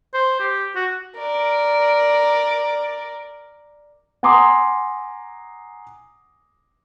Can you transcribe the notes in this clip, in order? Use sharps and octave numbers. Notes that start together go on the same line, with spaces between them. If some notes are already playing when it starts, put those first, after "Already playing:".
C5
G4
F#4
A#4 D5
F#5 G#5 A#5 C6 D6 D#6